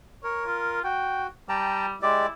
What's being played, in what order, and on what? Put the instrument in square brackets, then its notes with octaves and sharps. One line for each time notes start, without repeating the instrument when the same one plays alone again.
[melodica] A#4 [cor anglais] C#5
[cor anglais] F4
[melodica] F#4 [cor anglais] G5
[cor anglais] G3 [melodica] G5 A5 A#5
[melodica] G#3 G4 D5 [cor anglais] E4